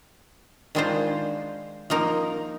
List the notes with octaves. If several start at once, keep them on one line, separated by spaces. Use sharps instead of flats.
D#3 G#3 D4 F4 C5
F3 A#3 D#4 A#4